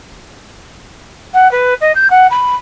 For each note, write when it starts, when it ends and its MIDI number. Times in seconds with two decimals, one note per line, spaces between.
1.34 1.50 78
1.51 1.74 71
1.81 1.92 75
1.95 2.10 91
2.10 2.27 78
2.31 2.55 83